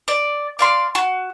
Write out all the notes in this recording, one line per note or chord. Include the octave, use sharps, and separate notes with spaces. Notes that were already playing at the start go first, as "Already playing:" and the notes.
D5
D5 F5 C6
F#4